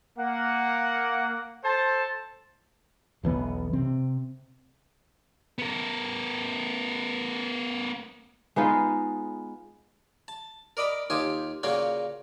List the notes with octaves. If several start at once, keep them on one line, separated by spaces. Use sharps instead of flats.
A#3 F#5
A4 C5 A5
E1 B1 E3 B3
C3 C4
B3 A#4
G#3 B3 D#4 F4
A5
A#4 D5 D#5 B5
D#2 D#4 F4 G4 G#5 C6
A#2 C#3 A#3 C#4 F#4